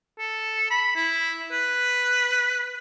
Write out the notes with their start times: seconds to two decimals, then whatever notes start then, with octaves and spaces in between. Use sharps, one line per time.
0.19 A4
0.71 B5
0.96 E4
1.52 B4